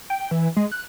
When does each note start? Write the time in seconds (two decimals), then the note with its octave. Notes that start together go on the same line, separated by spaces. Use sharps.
0.10 G5
0.31 E3
0.57 G#3
0.72 F#6